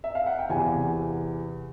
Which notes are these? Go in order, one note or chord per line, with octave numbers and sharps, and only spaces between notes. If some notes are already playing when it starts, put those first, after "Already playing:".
E5
F5
F#5
G5
E2 C3 E3 G#5